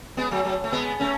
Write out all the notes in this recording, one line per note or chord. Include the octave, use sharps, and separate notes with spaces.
G#3 B3
F#3 A3
F#3 A3
A3
G#3 B3
A3 C#4